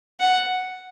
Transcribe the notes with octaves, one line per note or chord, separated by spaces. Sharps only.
F#5